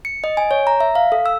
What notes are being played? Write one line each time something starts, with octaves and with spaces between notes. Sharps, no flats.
C#7
D#5
G#5
C#5
A#5
E5
F5
A4
E6